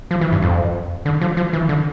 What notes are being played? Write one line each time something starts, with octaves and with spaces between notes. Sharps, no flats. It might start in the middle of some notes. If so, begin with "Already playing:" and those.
F3
E3
G2
F2
D3
F3
F3
E3
D3